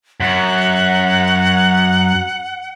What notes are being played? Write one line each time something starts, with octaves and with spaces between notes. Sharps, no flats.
F#2 F#5